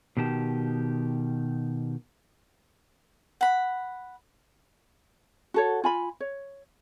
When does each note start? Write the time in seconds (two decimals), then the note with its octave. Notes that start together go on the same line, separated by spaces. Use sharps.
0.17 B2 D#3 G4 A5
3.41 F#5 B5
5.54 F#4 A4 C#5
5.84 F4 G#5 B5
6.20 C#5